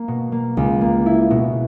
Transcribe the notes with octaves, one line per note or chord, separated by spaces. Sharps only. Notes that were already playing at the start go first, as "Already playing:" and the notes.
Already playing: A#3
B2
A#3
C#2
A#3
E4
B2